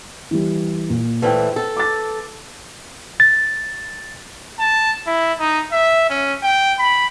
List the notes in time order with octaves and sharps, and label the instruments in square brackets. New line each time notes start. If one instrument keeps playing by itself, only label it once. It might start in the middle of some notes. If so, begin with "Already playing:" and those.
[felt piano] E3 G3
A#2
[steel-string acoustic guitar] A#2 E3 A3 [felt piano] B4 C5 G5
[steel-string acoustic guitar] A4
[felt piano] D6 A6
[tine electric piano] A6
[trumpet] A5
E4
D#4
E5
C#4
G5
B5